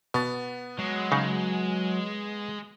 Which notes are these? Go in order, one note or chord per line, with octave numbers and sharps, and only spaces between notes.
B2 B3 A6
F#3 G#3
C#3 D#4